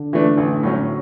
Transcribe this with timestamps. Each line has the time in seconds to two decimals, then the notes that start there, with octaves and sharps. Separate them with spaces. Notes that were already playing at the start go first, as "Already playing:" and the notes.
Already playing: D3
0.13 E3 A3 D4
0.37 A1
0.63 A2 F#3 C#4